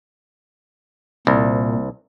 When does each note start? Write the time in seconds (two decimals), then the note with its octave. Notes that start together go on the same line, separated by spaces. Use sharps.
1.27 C2 A#2